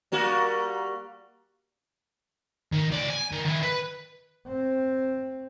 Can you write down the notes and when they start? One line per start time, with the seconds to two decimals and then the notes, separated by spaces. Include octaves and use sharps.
0.12 G3 A#3 F#4
2.72 D#3
2.92 C#2 D5
3.10 G#5
3.32 D#3
3.45 D#3 E4
3.63 B4
4.47 C4